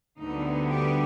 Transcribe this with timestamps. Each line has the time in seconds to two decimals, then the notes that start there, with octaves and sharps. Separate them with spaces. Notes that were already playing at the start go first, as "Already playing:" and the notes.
0.20 D2 D3 G3 B3 D#4
0.71 G4